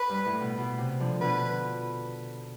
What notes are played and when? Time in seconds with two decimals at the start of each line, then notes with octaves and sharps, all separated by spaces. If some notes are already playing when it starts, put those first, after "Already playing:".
Already playing: B4
0.09 G2
0.26 A2
0.41 B2
0.58 B2
0.78 C3
1.00 D3 F3
1.21 B2 D3 B4